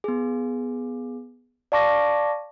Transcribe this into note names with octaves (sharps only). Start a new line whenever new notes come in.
B3 G#4
D5 F5 A5 C#6 D6 A#6